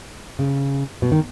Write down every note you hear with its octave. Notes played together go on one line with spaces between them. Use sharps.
C#3
B2
D#3